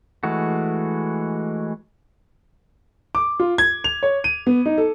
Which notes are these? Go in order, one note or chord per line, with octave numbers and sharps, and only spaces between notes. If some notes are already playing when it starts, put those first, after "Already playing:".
E3 G#3 A3 F#4
D6
F4
G#6
F7
C#5
D#7
B3
D#4
A4